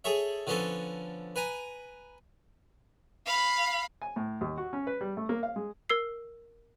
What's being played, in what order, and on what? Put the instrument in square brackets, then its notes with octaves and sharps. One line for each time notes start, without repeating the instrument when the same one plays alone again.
[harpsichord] G#4 A4 C#5 E5
D3 F3 B3 C#4 A4
B4 G#5 A#5
[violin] F5 B5
[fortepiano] G#5
A2
D#2
F#4
C#4
B4
G3
A3
A#3
F5
G#3
[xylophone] A#4 E6 C7